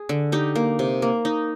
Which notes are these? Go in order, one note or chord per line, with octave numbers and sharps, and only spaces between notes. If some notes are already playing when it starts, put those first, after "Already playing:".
Already playing: G#4
D3
D#4 G4
A#3
C3
A#3
D#4